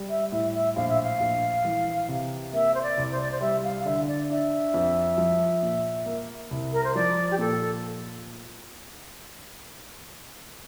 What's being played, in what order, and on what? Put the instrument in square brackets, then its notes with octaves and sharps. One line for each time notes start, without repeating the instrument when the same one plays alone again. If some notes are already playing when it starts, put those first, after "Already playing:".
Already playing: [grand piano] G3
[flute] E5
[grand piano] A2 [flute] E5
[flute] E5
[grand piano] A#1 [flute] F5
[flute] E5
F5
[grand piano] A#1
E3
C3
[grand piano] A#3 [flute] E5
[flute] C5
D5
[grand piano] C2
[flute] C5
D5
C5
[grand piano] G3 [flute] E5
[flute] F5
[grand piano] D3 [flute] E5
[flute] D5
[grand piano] D4 [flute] E5
[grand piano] F2
F3
A#2
A#3
C2
[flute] A#4
C5
[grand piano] F3 [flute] D5
[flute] G4
[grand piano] A#2 [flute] A4